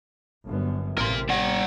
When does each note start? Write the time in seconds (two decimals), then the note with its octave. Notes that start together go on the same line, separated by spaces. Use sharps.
0.46 G1 F#2 B3
0.98 A1 C3 A#4 C6
1.29 G3 F#5